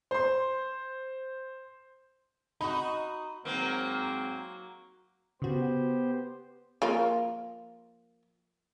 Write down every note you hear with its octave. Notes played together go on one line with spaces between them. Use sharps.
C5 C6
D#4 F#4 B5
G#2 F#3 A#3 C4
C#3 B3 F#4 G4 C5
F3 A#3 F4